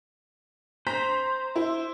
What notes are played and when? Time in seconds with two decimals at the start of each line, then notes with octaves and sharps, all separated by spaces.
0.87 C5 A#5 B6
1.56 E4